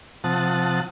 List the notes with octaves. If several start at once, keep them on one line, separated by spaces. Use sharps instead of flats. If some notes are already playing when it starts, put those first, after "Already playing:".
C3 F3 F#5 A5 D#6